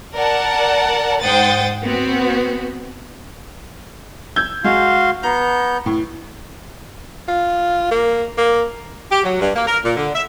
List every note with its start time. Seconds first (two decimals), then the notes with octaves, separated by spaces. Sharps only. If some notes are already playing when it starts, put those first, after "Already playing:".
0.14 A#4 D5 F#5 A5
1.22 G#2 C5 F#5 G5 D#6 A6
1.85 B3 C4 F#4
4.36 E6 G6 G#6
4.64 G#3 F#4 F5 C6
5.23 B3 A#5 G6
5.86 A2
7.28 F4
7.91 A#3
8.38 A#3
9.11 G4
9.23 F#3
9.40 G2
9.54 A#3
9.67 A#4
9.83 A#2
9.96 D3
10.14 E5